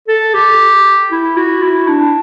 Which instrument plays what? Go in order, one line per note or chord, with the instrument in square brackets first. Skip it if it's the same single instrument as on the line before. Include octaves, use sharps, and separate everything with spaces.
[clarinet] A4
G4
E4
F#4
E4
D4